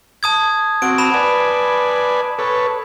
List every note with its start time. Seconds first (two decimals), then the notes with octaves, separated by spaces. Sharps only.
0.23 A5 D#6 G#6
0.82 C4 F#4 D7
0.98 A5 B5 E7
1.14 B4 D5 G#5
2.39 A4 B4 C#5